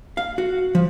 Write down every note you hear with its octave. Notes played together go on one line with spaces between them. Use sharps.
F5
F#4
F3